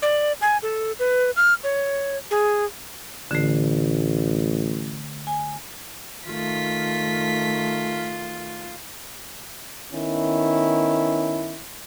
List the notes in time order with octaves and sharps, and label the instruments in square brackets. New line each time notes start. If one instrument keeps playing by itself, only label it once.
[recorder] D5
G#5
A4
B4
F6
C#5
G#4
[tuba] A1 [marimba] D3 A3
[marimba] G#5
[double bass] D#3 A3 [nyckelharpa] F4 [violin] B6
[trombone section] D#3 B3 C#4 E4